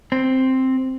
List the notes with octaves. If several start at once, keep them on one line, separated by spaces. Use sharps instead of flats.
C4